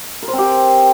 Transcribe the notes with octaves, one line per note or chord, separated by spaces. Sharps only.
A#4
C5
C4
G4